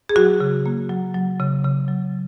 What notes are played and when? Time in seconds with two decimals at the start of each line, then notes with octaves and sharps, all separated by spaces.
0.09 G#4
0.16 F#3 F#4
0.40 C#3
0.66 A#3
0.90 F#3
1.14 F#3
1.40 C#3
1.64 C#3
1.88 F#3